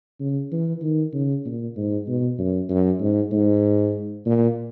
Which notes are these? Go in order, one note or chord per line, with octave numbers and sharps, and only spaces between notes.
C#3
E3
D#3
C#3
A#2
G#2
B2
F#2
F#2
G#2
G#2
A#2